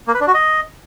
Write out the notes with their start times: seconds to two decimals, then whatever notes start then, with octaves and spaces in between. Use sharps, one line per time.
0.08 A#3
0.14 B4
0.21 D4
0.28 F#4
0.34 D#5